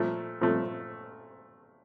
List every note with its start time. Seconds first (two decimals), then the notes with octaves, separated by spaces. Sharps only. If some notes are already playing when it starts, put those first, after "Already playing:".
Already playing: A#2 F3 A3
0.41 A#2 F3 A3